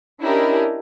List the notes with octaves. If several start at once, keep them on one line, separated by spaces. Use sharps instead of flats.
C#4 D4 E4 G4 A#4 D#5